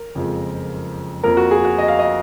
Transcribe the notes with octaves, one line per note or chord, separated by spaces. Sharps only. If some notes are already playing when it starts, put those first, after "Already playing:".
Already playing: A#4
F#1 F2 F3 G#3
F2 F3 A#3 A#4
F#4
G#4
F#4
D#5
F5
D#5